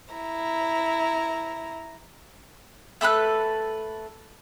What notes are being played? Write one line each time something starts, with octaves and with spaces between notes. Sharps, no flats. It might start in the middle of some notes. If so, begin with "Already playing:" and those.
E4 A#5
A3 A4 B4 F#6